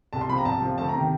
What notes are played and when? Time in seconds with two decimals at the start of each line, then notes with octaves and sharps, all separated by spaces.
0.13 C2 A5
0.21 C6
0.29 C3 F3 B5
0.38 A#5
0.45 C2 A5
0.62 C3 F3
0.78 D2 A5
0.89 A#5
0.94 C3 D#3